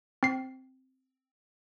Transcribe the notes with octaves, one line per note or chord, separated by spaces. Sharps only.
C4 C7